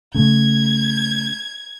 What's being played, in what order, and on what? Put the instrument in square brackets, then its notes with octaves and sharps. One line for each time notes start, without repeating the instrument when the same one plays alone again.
[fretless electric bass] C#3 A3 [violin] G#6